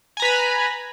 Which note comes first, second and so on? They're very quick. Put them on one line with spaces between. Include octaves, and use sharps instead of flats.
G#5 A#5 B4 B5